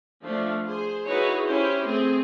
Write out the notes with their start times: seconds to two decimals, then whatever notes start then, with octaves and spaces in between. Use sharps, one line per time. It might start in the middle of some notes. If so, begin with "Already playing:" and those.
0.22 F3 A3 D4 F4
0.66 G#4 C5
1.07 D#4 E4 F#4 G#4 B4 C#5
1.45 C#4 E4 G4 C5
1.87 A3 C4 G#4